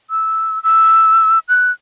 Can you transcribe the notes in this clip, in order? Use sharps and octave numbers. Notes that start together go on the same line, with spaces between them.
E6
E6
F#6